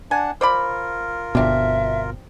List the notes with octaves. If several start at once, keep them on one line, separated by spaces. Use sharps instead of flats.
D4 F#5 G#5 A5
F4 A#4 C5 D5 B5
G1 B2 C4 D4 E5